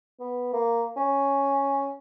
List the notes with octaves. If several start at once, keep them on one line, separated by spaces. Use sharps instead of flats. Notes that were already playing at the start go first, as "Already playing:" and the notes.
B3
A#3
C#4